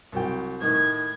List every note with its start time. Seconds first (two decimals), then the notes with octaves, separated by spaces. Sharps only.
0.12 C2 F#3 G5
0.61 A2 D#3 G#6